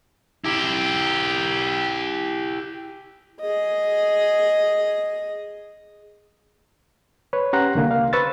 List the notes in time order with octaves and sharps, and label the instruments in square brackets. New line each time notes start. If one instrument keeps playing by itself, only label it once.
[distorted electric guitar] E4 G4
[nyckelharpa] G#4 D#5
[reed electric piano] B4 C#5
C#4 G4 F#5 A#5 C6 F#6
C2 D3 A#3
F5
B4 C5 C#6 E6 A6